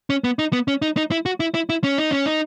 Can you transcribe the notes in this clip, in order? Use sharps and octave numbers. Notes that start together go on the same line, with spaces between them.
C#4
B3
D#4
B3
C#4
D#4
D#4
E4
F#4
E4
E4
E4
C#4
D#4
C#4
D#4